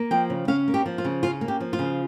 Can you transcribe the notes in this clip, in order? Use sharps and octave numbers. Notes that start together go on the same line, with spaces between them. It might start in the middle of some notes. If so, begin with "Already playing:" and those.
Already playing: A#3
F3 G5
C#3
C#4 F5
A#3
G4
F3
F4
C#3
C#4 F4
A#3
G4
F3
F4
C#3